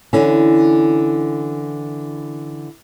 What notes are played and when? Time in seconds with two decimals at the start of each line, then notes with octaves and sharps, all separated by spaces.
0.13 D3 E3 C#4